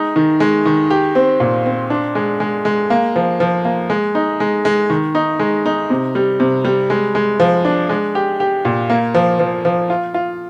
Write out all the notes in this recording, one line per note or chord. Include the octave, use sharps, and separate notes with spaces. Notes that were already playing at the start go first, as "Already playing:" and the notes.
Already playing: G#3 D#4
D#3
G#3
D#3
G4
C4
A#2
C4
D4
G#3
G#3
G#3
A#3
F3
F3
A#3
G#3
D#4
G#3
G#3
D#3
D#4
G#3
D#4
C3
G3
C3
G3
G#3
G#3
F3
D4
G#3
G4
G4
A#2
A#3
F3
F3
F3
F4
F4